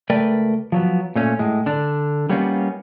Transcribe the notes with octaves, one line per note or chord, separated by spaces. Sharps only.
C#2 A3 A#4 B4 D5 G5
F3 F#3 B3
A#2 A3 C#4
A2 G#3
D3 D4
G3 A#3 B3 C#4 D#4 F4